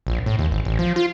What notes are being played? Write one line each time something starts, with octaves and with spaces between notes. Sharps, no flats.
A#1
A2
D#2
G#1
A1
F3
F4